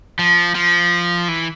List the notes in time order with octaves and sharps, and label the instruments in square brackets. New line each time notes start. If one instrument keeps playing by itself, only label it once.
[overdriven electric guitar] F3
F3
E3